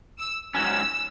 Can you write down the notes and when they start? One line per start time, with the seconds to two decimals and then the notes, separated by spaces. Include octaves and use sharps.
0.19 E6
0.55 G#2 F#3 C#4 E6